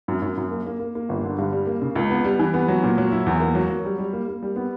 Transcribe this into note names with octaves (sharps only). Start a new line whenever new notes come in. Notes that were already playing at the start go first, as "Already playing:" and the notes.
F#2
F#2
F#2
A#3
A#3
A#3
A#3
G1
D3
G2
G3
A#3
C#3
C#2
B3
G3
E3
B3
F#3
A#2
F#3
E4
E2
A#3
F#3
F#3
G3
G3
A#3
A#3
G3
B3